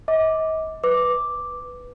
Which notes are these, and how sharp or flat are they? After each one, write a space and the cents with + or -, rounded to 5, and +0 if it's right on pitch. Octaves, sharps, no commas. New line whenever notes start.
D#5 +40 D6 +0
B4 +0 D6 +0